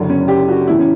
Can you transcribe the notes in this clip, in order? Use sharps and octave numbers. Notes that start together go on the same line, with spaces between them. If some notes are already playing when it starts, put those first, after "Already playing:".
Already playing: F#1 F#2 D3 F#3
C#4
G4
F#4
A1 A2 E3 E4
C#4